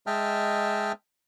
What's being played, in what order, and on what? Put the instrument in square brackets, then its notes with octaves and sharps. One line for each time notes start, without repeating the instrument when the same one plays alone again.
[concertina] G#3 D#5 E5 G5 A5 F6